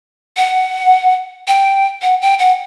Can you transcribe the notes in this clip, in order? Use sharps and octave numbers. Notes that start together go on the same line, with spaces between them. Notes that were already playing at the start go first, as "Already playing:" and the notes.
F#5
G5
F#5
G5
F#5